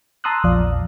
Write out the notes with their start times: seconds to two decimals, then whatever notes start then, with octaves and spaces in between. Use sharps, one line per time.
0.24 A5 A#5 C6 D#6 E6 F#6
0.44 A#1 E2 F3 D5 F5